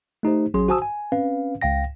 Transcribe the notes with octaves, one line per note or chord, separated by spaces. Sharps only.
A3 D#4 G4 C5
A1 F#3 C#4 G#4 C6
F#4 C5 G#5 A5 D#6 E6
G#5
C4 C#4 B4 F5
C#2 F5 G5 A#6